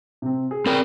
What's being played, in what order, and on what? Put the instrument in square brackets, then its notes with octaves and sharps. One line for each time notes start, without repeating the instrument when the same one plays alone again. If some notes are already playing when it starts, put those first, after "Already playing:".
[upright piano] C3 C4
G#4
[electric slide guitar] C4 A#4 G5